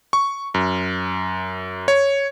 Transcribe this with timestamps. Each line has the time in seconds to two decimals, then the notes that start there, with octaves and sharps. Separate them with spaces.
0.13 C#6
0.54 F#2
1.88 C#5